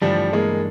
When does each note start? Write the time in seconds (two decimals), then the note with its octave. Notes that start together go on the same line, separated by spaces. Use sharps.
0.01 G2 E3 F3 G3 A3 D4
0.33 G#3 A#3